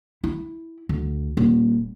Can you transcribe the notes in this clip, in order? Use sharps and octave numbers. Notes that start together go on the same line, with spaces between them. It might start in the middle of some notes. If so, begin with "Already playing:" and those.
E4
D2
D#1